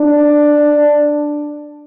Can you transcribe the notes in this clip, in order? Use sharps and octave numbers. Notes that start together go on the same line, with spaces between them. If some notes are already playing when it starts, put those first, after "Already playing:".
Already playing: D4